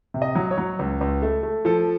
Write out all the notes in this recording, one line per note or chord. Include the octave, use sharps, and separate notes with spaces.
C3
D#5
F#3
C#5
F#3
C#2
C#2
A3
A3
F3 A4